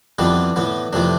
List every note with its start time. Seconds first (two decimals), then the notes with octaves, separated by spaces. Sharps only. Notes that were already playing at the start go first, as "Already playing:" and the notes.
0.19 F2 E3 G3 B3 D4
0.56 A2 E3 B3
0.93 F2 C3 E3 A3 D4